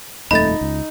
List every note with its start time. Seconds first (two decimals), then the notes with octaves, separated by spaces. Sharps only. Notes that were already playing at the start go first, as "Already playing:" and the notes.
0.31 D#1 F2 A3 D#4 B5 A6
0.61 C#2